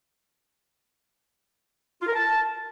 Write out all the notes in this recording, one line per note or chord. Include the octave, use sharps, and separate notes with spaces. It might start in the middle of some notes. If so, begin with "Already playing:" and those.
F4
A#4
A5